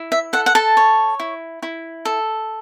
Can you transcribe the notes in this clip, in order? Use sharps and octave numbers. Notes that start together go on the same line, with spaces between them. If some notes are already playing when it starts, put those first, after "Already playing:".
Already playing: E4
E5
A4 F#5
F#5
A4 A5
C#5
E4
E4
A4